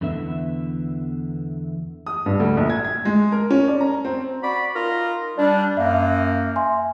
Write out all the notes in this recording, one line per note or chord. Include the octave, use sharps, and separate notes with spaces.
E2 D3 B3 E5
D#6
G2
D2
A#1
G#6
G#6
G#3
A#4
C#4
D5
A#5
C4
F#4 D5 B5
D#4 F4 A#4
G3 D4 D5
F#2 A#3 E5 F5
E5 G#5 C6